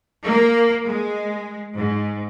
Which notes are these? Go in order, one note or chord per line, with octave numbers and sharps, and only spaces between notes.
A#3
G#3
G#2